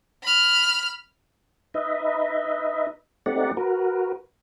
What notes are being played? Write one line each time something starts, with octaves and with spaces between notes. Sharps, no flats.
B5 F6
D#4 B4 D#5 E5
A3 C4 D#4 G4 D5 F#5
F#4 A#4 B4